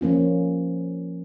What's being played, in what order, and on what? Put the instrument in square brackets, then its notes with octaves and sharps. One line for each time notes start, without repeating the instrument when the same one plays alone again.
[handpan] F3 A#3 C#4 F4